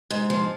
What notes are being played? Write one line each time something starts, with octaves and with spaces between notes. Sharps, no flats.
G#2
F3